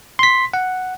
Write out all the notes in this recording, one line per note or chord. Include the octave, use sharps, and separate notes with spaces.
C6 B6
F#5